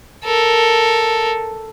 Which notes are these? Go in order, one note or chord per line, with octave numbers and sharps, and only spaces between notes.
A4 A#4